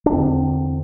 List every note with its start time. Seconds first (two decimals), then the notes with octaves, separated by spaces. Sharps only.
0.06 D4
0.12 E2 D3 C4